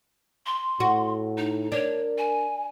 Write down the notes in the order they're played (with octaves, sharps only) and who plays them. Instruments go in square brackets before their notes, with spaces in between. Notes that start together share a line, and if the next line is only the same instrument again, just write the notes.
[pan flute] C6
[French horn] A2 [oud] F#4
[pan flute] D#4
[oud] D4 [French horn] A#4 [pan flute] C#5
[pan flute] G#5